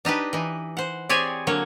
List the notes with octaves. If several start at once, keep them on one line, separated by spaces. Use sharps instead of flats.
D4 D#4 G4 B4
E3 D#4
C5 F#5
C4 G4 G#4 C#5 D5 G#5
D3 F#3 A#3 C#5